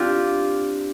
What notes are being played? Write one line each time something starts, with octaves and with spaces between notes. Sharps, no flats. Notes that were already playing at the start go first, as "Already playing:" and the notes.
Already playing: C4 D4 F4 G4